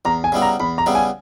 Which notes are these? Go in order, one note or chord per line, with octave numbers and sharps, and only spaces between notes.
E2 A#5
G#5
C#3 G3 B3 E4
A#5
E2 B5
A#5
C#3 G3 B3 E4
G#5